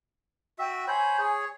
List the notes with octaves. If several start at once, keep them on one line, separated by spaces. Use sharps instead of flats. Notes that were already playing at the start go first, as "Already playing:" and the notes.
F#4 E5 G5
C5 C#5 G#5 B5
G#4 C#5